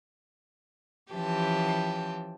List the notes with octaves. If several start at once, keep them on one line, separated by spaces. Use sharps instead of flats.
E3 F3 C#4 G4 G5 A5